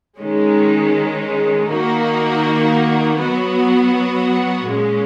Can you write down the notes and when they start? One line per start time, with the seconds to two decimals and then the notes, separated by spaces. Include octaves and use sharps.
0.19 D#3 G#3 C#4
1.69 D#3 A#3 D#4 F#4
3.18 F#3 B3 F#4
4.68 A#2 G#3 C#4